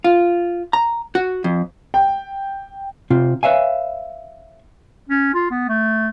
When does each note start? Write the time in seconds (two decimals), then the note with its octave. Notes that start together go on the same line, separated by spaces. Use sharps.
0.04 F4
0.73 A#5
1.15 F#4
1.44 F2
1.94 G5
3.10 C3 C4 F4
3.43 B4 C#5 E5 F5 G#5
5.09 C#4
5.34 F4
5.51 B3
5.69 A3